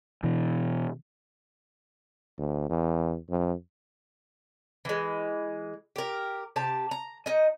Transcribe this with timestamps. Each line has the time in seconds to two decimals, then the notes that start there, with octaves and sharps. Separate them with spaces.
0.23 B2 E3
2.38 D2
2.69 E2
3.30 F2
4.85 E3 G#3
5.96 G4 A#4
6.56 C3 G4 A5
6.91 A#5
7.26 D#4 D#5